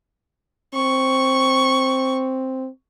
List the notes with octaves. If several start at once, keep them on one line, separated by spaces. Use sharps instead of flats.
C4 C#6